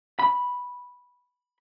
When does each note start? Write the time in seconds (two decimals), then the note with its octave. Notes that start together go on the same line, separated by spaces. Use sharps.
0.19 B5